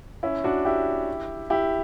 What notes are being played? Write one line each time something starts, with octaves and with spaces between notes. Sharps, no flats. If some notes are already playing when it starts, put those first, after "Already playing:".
C#4 E4
D4 F#4
E4 G4
E4 G4